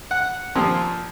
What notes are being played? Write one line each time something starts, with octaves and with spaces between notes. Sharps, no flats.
F#5
A#2 F3 C4 G4